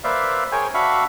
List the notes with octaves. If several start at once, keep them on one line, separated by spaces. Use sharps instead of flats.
A#3 B4 C5 D5 E5 F5
G#4 A#4 C5 C#5 G5 G#5
D4 F#4 E5 F5 B5 C#6